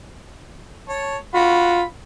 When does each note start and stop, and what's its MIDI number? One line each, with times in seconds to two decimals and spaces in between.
0.89 1.17 73
0.89 1.17 81
1.34 1.85 65
1.34 1.83 66
1.34 1.83 83